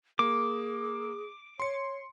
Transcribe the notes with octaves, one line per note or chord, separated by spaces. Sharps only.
A#3 G#4 D6
C#5 C6 C#7